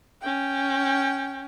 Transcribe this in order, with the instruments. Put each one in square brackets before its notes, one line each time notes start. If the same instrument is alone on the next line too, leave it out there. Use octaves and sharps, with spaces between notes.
[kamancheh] C#4 G5